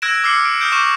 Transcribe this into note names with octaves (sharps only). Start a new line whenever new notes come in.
E6 F#6 G#6 A#6 D7 E7
D6 E6 F6 C7 C#7
D7
D#6 F6 G6 D7
C#6 D6 F#6 G6 E7